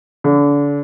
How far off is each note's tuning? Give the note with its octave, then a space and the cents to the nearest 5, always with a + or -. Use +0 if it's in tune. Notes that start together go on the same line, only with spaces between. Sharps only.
D3 -35